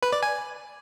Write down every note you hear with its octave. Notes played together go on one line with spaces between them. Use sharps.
B4
D5
G#5